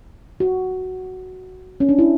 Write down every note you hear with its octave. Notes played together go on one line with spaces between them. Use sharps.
F#4
C#4
D4
E4